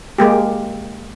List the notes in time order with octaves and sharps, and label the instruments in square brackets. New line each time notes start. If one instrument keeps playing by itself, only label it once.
[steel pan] G#3 A#3 G4